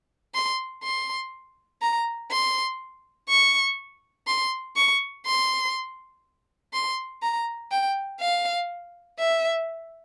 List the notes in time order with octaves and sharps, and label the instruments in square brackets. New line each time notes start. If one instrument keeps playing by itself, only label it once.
[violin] C6
C6
A#5
C6
C#6
C6
C#6
C6
C6
A#5
G5
F5
E5